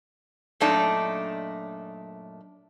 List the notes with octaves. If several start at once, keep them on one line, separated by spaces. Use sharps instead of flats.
F#2 A#2 A3 D4 D#4